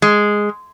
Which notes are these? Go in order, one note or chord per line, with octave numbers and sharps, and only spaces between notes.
G#3